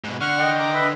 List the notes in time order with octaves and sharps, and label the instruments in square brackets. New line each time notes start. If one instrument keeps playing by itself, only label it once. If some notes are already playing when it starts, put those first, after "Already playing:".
[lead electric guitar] G#2 B2
[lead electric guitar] D3 [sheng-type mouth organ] F#5 C#6 F6
[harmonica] D#5 G5
[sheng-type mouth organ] A#5 D6
B4 E5 B5